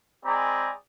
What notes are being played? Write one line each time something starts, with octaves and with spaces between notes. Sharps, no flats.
G#3 C4 G#4 D5 A#5 B5